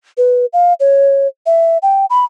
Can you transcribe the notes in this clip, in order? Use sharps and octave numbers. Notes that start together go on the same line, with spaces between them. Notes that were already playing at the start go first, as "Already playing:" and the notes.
B4
F5
C#5
E5
G5
B5